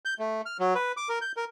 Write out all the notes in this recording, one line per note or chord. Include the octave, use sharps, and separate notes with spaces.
G6
A3
F6
F#3
B4
D6
A#4
G6
A#4